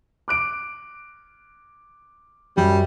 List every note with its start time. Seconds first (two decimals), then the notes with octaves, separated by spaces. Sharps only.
0.28 D6 F#6 D7
2.57 F#2 G3